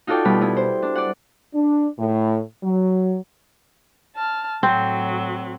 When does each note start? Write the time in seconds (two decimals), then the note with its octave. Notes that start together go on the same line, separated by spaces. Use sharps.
0.07 D#4 F4 F#4 A4 D5 G5
0.25 B2 G3 B3 F4 B5
0.41 B3 E4
0.57 C5
0.82 D4
0.95 D5 F#5
1.54 D4
1.99 A2
2.63 F#3
4.16 A5 F6
4.63 A2 F#3 C4